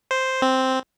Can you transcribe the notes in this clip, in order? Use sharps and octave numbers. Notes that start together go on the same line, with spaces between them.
C5
C4